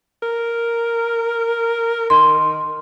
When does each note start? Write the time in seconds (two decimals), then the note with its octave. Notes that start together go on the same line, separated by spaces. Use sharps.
0.23 A#4
2.10 D#3 C6